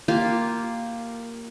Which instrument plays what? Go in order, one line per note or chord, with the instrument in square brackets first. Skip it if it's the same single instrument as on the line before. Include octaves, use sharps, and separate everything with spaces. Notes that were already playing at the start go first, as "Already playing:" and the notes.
[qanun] A#3 F4 G4